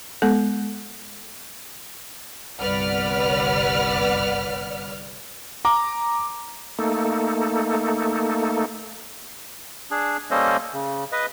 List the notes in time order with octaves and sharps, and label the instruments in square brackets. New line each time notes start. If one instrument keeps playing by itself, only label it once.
[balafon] G#3 B3 A4
[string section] G1 C2 B4 D5 F#5 F6
[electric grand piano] A#5 D6
[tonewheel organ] A3 A#3 D#4 A4
[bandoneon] D4 G#4
G3 A#3 C#4 A4 C5 D#5
C#3
B4 D#5